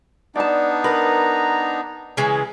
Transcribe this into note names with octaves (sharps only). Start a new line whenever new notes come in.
B3 D4 D#4 D5 A5
A#4 B4 A#5
C#3 E3 G#3